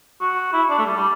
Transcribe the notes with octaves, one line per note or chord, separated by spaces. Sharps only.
F#4
E4
D4
A3
G3
G3